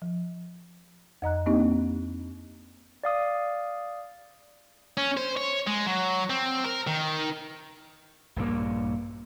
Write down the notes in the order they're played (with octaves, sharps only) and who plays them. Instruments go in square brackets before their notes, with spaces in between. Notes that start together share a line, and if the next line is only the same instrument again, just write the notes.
[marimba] F3
F2 D#5 A#5 F#6
A#3 C4 D4 D#4 G4 D#5
[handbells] D5 F5 D#6
[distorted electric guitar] C#4
C5
C#5
G#3
F#3
C4
A#4
D#3
[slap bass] A#1 G2 C#3 A#3